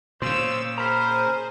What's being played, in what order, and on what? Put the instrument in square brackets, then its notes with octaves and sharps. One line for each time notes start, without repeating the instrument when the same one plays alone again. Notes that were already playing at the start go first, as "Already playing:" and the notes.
[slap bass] A#2 C#3 [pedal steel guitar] C5 [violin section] F5 E6
[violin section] G#4 C5 [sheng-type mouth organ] A#4 [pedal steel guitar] A#5 B5